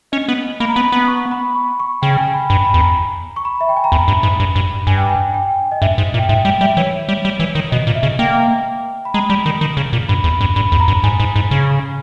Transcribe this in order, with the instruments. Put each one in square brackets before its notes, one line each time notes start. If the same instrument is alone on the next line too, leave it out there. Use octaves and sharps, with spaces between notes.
[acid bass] C#4 [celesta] D#5
[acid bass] B3
[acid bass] A#3 [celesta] B5
[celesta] A#5
[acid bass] B3 [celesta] B5
[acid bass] B3
[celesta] C#6
B5
C#6
C#6
[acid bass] C#3 [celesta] G5
[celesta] G#5
B5
[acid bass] G2 [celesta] B5
[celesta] B5
[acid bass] E2
[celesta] A#5
C#6
B5
E5
G5
G#5
A#5
[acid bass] E2 [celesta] B5
[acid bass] G2
G#2
G2
G2
[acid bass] G2 [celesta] G#5
[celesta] G5
G#5
G5
D#5
[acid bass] G2 [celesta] E5
[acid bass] G#2
A#2
[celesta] G5
[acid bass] G#2 [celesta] E5
[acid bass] G3 [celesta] G5
[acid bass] G3 [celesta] E5
[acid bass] E3 [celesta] C#5
[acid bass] G3
G3
E3
D#3
[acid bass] B2 [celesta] D#5
[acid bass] A#2
[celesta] E5
[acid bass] C#3
[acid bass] A#3 [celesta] G5
[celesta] B5
[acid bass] G#3 [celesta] A#5
[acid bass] G3
D#3
D#3
C#3
A#2
[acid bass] G2 [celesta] B5
[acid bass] E2
G2
[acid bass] G2 [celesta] B5
[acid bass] E2
[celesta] A#5
[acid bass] G2
[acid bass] G#2 [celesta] G#5
[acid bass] G#2
G#2
C#3